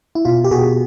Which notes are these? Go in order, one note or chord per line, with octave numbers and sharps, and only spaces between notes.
E4
B2 F4
G4
B2 F#4 G#4